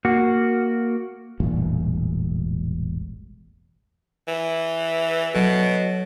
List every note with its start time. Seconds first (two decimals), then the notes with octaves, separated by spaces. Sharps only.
0.05 A#3 F#4
1.40 E1 A1 G2 A#2
4.28 E3
5.34 B2 F#3 A4